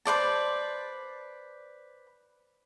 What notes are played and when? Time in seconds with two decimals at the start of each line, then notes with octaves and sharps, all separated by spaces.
0.05 B4 C5 D5 A5